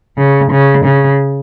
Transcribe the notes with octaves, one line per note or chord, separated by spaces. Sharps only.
C#3
C#3
C#3